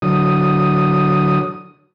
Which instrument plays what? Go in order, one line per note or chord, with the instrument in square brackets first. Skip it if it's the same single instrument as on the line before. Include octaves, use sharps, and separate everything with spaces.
[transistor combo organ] D3 F#3 D#6